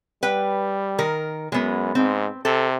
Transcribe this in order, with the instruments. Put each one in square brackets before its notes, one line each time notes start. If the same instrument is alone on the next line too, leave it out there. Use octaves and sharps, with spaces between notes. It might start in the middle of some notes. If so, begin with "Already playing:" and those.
[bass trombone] G3 [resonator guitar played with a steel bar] B4 G5
[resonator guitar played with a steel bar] D#3 A#4
[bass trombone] F#2 [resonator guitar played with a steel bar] G#3 B3
[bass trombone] G#2 [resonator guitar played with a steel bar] C4
[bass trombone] C3 [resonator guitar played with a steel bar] A4